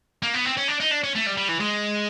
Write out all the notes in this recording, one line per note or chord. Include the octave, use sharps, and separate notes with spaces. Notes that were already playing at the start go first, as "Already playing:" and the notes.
A#3
B3
C4
C#4
D4
D#4
D4
C#4
A3
G3
G3
E3
G#3